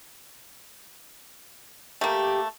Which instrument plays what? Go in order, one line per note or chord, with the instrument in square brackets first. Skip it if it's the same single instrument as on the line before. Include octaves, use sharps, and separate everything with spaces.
[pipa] A3 A#3 [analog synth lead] G4